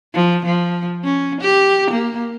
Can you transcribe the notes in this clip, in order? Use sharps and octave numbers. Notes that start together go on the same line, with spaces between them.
F3
F3
C#4
G4
A#3